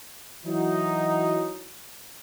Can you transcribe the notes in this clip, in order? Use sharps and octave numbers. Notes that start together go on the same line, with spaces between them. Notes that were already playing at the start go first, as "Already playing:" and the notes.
E3 F#3 D#4